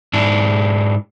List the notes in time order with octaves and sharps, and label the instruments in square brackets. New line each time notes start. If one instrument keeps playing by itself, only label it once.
[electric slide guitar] G#2 D4 E4